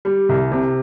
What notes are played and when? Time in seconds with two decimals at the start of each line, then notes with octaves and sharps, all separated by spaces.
0.05 G3
0.29 C2
0.51 C3